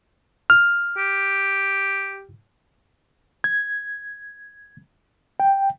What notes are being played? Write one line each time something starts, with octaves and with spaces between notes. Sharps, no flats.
F6
G4
G#6
G5